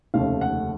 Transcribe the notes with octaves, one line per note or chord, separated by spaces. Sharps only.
F1 D#2 C#3 A3 F5
F#5